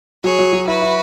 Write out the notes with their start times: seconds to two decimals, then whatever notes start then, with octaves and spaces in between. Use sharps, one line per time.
0.24 F#3 G#4 C#5
0.39 F#3
0.53 F#3
0.67 E4 F#4 B4
0.82 E4